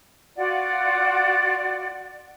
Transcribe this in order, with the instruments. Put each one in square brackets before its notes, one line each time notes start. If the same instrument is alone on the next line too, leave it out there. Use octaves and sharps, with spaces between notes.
[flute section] F4 F#4 D5 F#5